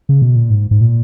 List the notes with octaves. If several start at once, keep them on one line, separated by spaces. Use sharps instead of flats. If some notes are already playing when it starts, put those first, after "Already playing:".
C#3
B2
A#2
G#2
G#2
A#2